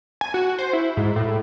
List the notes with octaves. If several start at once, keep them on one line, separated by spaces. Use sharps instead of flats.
G#5
F#4
C5
E4
G#2
A2